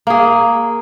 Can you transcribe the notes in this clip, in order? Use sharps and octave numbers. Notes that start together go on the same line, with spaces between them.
A#3 G#4